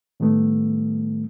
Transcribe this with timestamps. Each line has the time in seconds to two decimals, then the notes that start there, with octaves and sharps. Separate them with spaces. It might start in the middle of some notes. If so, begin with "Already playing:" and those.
0.20 A2 D#3 G3 A3 B3